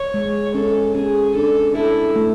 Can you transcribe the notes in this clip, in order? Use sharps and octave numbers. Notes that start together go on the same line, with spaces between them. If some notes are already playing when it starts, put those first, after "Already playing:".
Already playing: C#5
G#3
C#4 A4
C#4 G#4
D4 A4
E4 A4
A3